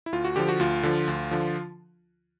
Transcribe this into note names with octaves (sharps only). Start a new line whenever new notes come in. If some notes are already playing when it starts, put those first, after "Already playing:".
E4
D2 F4
F#4
D3 F3 G4
F#4
D2 F4
D3 F3
D2
D3 F3